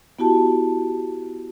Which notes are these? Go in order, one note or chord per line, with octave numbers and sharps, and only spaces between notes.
B3 E4 F#4 G4 A5